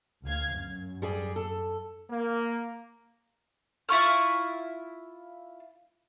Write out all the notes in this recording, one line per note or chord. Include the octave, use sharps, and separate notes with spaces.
D2 F5 G#6
F#2
G3 G#4 D5
A4
A#3
E4 F4 C#6 F6